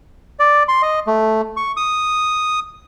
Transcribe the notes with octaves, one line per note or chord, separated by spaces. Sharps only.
D5
C6
D#5
A3
C#6
D#6